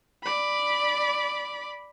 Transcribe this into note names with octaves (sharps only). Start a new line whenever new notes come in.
D5 B5